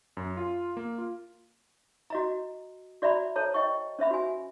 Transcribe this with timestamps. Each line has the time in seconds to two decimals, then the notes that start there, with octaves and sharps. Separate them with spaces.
0.17 F#2
0.37 F4
0.77 A#3
0.98 F4
2.10 F#4 D#5 A#5
3.02 F#4 D5 E5 A#5 B5
3.36 A4 C5 C#5 A5 A#5
3.54 D#5 G5 C#6
3.99 C#4 C5 E5 B5
4.11 F#4 G#5